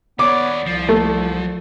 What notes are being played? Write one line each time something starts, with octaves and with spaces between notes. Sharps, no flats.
D#2 B3 C#5 D5 D6
C2 F3
A3